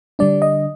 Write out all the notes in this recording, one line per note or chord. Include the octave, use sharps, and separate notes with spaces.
D3 G3 D4 D5
D#5